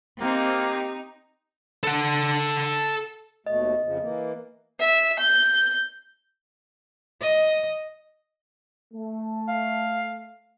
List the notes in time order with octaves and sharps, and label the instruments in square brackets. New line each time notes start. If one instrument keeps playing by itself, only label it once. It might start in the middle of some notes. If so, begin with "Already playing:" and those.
[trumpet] A#3 [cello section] C4 [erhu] D#4 [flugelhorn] G4
[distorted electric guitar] A4 F#5
[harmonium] D#2 B2 A3 [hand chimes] D#5
[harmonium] F2 C#3 F3
E3 A#3
[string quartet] E5
G6
[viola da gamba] D#5
[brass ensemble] A3
[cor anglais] F5